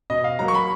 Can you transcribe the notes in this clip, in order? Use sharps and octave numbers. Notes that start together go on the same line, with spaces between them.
B2 D#5
F5
F#3 A#3 A#5
C#6
B5